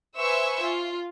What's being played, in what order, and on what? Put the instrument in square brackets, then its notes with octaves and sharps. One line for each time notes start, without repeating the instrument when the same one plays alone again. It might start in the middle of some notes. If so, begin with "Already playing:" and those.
[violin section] B4 C5 E5 G#5 C#6 E6
F4